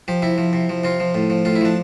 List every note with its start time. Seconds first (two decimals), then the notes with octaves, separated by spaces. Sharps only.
0.08 F3 G4
0.22 C3 E4
0.38 F3
0.53 C3
0.69 F3
0.84 C3 F4
1.00 F3
1.15 A2
1.30 F3
1.45 A2 F4
1.56 E4
1.61 F3 D4